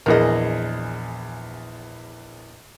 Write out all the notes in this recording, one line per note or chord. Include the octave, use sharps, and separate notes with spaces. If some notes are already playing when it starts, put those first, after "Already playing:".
A#1 E2 G#4 A#4 D#5